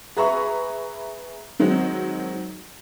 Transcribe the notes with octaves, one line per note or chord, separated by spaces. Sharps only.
G#4 B4 E5 A#5 B5 C#6
D#3 F#3 G#3 C4 D#4